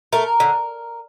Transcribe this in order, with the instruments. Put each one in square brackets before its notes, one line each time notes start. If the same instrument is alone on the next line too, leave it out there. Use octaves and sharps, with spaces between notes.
[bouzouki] A3 A#4
D3